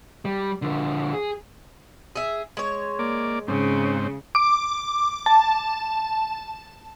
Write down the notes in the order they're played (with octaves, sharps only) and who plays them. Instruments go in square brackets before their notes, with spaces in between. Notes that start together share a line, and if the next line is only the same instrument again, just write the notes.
[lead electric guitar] G3
D3 F3
G#4
[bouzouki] G#4 E5
G#3 C#5
[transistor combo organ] A#3 D5
[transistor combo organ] G#2 C4 [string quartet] C#3
[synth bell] D6
A5